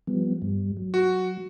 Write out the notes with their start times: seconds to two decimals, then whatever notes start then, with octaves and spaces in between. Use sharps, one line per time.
0.07 F3 G3 B3
0.42 G2 G3
0.77 F#3
0.94 F#4